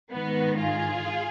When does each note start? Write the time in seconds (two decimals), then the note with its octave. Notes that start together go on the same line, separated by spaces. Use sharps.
0.11 G#2 D#3 B3
0.59 F4 G#4